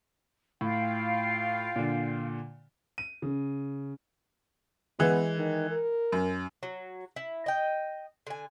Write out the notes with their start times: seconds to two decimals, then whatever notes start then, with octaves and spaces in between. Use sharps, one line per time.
0.61 A2 F4 F5 G5
1.76 A#2 D3
2.98 D#7
3.22 C#3
4.99 E3 G#3 B3
5.37 D#3
5.71 A#4
6.12 F#2
6.63 F#3
7.16 E4
7.46 D#5 G5
8.27 D3 G#5